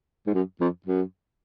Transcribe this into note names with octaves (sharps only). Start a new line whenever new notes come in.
G#2
F#2
F2
F#2